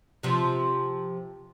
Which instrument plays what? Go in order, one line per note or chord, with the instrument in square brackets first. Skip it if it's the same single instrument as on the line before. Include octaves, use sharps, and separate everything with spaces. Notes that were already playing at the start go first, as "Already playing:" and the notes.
[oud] C3 F3